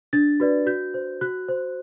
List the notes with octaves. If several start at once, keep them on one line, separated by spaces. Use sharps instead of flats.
D4 A6
F#4 B4 D5
F#4 G6
C5
F#4 F#6
C5